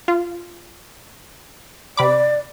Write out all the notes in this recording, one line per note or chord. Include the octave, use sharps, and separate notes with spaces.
F4
C3 D5 B5 D6